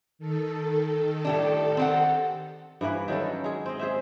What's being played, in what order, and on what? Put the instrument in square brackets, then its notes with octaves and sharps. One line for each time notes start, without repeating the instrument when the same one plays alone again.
[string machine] D#3 A4
[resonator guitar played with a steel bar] A2 G3 D4
C4 G4 F#5
[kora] G2 E3 A#3 B4
D#3 F#3 C#4 A4
G#3 G#4
C4 D#5
G#4 C5 E5